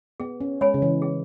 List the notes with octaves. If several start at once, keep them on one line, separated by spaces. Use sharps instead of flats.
B3 G#4
C#4
G#3 C#5 G#5 B5
C#3
E3
G#4